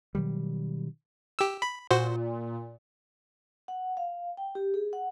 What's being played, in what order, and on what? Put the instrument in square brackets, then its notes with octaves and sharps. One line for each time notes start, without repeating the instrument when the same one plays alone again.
[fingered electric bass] B2 D#3 F#3 G3
[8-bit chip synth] G4 E6
B5
[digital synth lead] A#2 [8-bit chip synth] F#4 C5
[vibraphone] F#5
F5
G5
G4
G#4
F#5